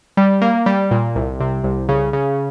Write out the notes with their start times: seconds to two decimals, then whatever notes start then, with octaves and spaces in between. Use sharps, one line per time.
0.17 G3
0.42 A#3
0.66 G3
0.91 A#2
1.15 C2
1.40 C3
1.64 C2
1.89 C#3
2.13 C#3